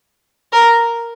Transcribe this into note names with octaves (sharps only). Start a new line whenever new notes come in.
A#4